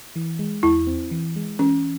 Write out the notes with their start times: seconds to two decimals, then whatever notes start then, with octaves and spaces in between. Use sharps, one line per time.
0.16 E3
0.39 G#3
0.63 E2 E4
0.87 C4
1.11 E3
1.36 G#3
1.59 E3 C#4